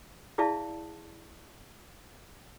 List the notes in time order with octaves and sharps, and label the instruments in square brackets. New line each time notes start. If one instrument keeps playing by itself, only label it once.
[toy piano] E4 G#4 D5 E5 F5 A5